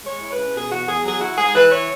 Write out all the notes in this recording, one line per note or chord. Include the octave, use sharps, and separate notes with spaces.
G#3 C#5
E4
B4
C#3
B2 G#4
E2 F#4
E2 G#4
F#3 G#4
E4 F#4
G#2 G#4
E3 B4
E4 C#5